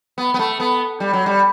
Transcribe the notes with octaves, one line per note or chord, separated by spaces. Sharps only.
B3
B3
A3
B3
G3
F#3
G3